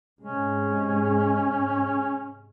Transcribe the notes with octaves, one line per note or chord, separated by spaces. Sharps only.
G#2 C3 G#3 C#4